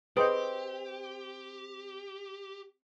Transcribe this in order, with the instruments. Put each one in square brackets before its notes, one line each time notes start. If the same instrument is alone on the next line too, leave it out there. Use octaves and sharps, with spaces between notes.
[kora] C4 [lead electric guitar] G4 [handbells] G#4 C5 [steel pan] B4 D#5